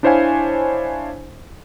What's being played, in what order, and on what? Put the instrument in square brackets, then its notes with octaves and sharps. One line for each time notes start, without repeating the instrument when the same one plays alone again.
[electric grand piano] D4 E4 C5 C#5 F5 G#5